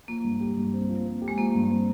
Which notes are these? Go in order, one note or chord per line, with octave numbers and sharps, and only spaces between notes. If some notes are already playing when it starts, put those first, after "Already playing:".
F3 A#3
G2
G4
G2
C4
F3
C4
G4
G#3
F3 A#3
G2
C4